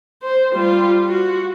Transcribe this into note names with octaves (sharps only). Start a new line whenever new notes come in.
C5
G3 F4
F#4